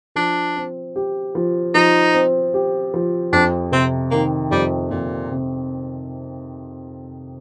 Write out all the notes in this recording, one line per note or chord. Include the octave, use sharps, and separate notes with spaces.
F3 D4
C4
G4
F3
F3 D#4
C4
G4
F3
F2 D4
C3 C4
D#3 A#3
F2 G3
F2 A#2
C3